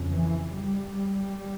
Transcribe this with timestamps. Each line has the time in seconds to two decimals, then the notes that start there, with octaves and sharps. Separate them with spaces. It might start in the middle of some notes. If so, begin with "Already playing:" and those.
Already playing: F2 C#3
0.12 E3
0.54 G3